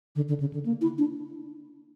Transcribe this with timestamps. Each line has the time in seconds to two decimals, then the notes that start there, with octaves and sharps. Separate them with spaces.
0.16 D3
0.29 D3
0.40 C#3
0.54 D3
0.65 A#3
0.81 E4
0.98 D4